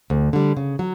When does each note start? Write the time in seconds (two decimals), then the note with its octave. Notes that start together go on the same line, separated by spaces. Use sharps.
0.10 D2
0.33 D3 G3
0.57 C#3
0.79 F#3